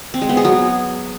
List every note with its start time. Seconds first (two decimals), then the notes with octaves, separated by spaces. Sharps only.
0.14 C4
0.22 G#3
0.29 B3
0.37 G#4
0.45 F#3